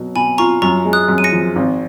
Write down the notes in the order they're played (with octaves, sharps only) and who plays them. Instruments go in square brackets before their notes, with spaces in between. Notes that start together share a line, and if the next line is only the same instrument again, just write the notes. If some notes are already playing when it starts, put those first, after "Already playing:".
Already playing: [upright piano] B2 F#3
[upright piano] B2 [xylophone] G#5 B5
[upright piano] F4 [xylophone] A#5 C#6
[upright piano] F#2 [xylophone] A#5 C#6
[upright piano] G#3
[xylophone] D#6 F#6
[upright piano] F#2
[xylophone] D#7
A#6 C#7
[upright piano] F3
G#1